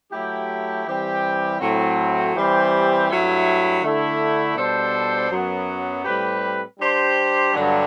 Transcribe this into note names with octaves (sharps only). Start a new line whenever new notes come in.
F#3 A3 E4 G4
E3 G3 C4 G4
A2 F#3 C4
E3 G3 C4 G4 C5
G2 F#3 A3 E4
D3 A3 E4
B2 G3 D4 A4 C5
F#2 F#3 B3
A2 G3 C4 G4 B4
G3 D4 G4 C5
G2 D3 F#3